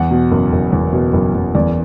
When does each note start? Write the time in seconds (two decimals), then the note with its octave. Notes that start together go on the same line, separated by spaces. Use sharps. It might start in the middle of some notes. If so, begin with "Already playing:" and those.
Already playing: E2 F#5
0.11 B2
0.31 F#1
0.53 F#1
0.72 E2
0.93 B2
1.13 F#1
1.35 F#1
1.55 E2 D5